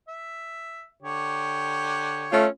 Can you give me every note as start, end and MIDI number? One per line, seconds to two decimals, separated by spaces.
0.08 0.88 76
1.02 2.43 50
1.02 2.43 67
1.02 2.43 73
2.31 2.47 57
2.31 2.47 61
2.31 2.47 65